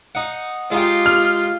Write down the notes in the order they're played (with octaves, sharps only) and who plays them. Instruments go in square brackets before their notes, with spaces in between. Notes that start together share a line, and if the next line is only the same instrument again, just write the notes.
[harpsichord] D#4 F#5
[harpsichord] G#3 D#4 G4 [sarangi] F4
[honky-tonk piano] F6